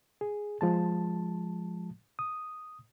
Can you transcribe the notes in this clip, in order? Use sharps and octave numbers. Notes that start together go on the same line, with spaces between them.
G#4
F3 G#3 A5
D#6